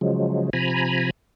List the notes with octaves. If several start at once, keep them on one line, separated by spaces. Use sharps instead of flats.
C#3 F3 F#3 G#3
C3 F3 G#5 A#5 B5